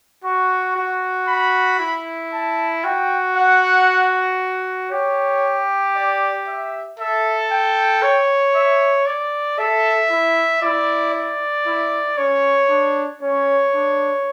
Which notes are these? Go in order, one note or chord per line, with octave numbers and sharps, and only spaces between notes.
F#4 C#6
F#4
B5
E4
A5
F#4 G5
F#5
G4 C#5
D5
E5
A4 E5
G5
C#5
E5
D5
A4 E5
E4
E4 D5
D5
E4
C#4 C#5
D4
C#4 C#5
D4